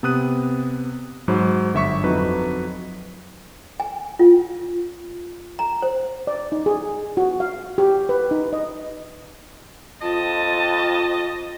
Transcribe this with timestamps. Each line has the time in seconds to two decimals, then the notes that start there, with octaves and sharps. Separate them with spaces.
0.03 C3 B3 D#6 F#6 D#7
1.28 G#2 F#3 C5 B5
1.74 G1 E5 C#6 B6
2.03 F2 F#3 D#4 B4
3.80 G#5
4.19 F4
5.59 A#5
5.82 C5
6.27 D5
6.52 D#4
6.66 G#4
7.17 F#4
7.40 F5
7.78 G4
8.09 B4
8.31 D#4
8.53 D#5
10.01 F2 F4 D#5 A5